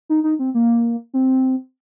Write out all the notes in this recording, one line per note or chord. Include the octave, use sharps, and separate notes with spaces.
D#4
D#4
C4
A#3
C4